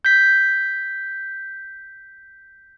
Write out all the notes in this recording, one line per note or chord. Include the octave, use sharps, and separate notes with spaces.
G6 B6